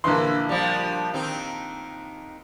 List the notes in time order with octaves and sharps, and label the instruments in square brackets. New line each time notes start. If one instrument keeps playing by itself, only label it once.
[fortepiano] A#1 D3 C6 [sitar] E3
[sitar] F3 G3
D#3 C4 D#4